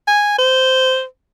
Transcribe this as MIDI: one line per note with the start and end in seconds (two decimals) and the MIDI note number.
0.07 0.34 80
0.38 1.04 72